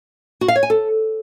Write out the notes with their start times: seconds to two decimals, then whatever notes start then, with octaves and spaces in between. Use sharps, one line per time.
0.41 F#4
0.48 F5
0.56 C#5
0.63 G#5
0.70 A4